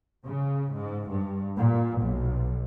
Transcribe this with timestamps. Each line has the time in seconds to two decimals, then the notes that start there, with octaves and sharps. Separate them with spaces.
0.25 C#3
0.74 G#2
1.09 G2
1.57 A#2
2.00 B1